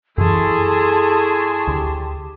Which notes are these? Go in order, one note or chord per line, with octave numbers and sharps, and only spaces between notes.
F#2 E3 E4 G#4 A4 A5 C6 C#6
D2 G4